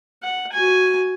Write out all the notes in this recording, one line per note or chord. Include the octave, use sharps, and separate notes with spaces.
F#5
F#4 G#5